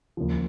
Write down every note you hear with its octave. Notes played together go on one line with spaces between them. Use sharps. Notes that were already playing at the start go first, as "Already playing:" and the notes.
D#2 C#3 F3